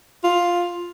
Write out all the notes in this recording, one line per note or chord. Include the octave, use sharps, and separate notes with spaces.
F4